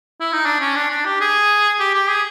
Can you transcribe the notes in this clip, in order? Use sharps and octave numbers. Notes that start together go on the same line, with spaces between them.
E4
D#4
D4
C#4
D4
D4
G4
G#4
G4
G4
G#4